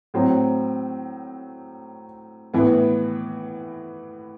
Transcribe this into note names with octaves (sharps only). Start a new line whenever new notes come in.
A2 F#3 C4
A2 E3 B3